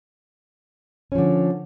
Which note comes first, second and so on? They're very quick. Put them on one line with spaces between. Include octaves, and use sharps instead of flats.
C#4 F3 D3